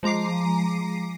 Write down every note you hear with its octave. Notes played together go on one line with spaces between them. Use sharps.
F3 G#3 A#5 D6 C7